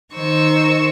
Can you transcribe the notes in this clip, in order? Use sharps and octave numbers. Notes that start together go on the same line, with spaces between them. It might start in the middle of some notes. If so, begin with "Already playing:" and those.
D#3 C5 C#6 E6